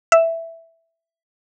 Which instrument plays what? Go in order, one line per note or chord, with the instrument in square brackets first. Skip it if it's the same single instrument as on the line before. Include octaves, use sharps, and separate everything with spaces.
[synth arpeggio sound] E5